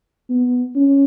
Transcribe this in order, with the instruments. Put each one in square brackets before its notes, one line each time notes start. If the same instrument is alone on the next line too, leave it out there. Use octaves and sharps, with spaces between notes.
[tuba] B3
C#4